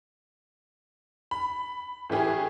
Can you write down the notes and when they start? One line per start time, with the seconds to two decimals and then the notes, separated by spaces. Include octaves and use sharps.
1.31 B5
2.10 A2 E3 G4 G#4